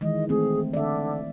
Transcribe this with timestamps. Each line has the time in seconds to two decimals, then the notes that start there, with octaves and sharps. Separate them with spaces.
0.01 D#3 E3 G#3 D#5
0.29 A3 C4 G#4
0.73 D3 D5 E5